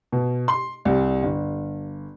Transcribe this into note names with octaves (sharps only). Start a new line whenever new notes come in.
B2
C6
C2
G1